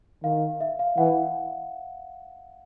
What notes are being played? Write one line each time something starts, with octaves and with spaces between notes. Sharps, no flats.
D#3 F5
E5
F5
E3 F#5